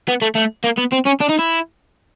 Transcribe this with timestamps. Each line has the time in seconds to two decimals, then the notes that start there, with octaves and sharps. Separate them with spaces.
0.08 B3
0.22 A3
0.35 A3
0.64 A#3
0.78 B3
0.92 C4
1.05 C#4
1.20 D4
1.29 D#4
1.39 E4